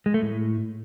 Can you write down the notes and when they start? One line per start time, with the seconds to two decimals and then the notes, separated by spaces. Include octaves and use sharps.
0.06 G#3
0.14 A3
0.22 A2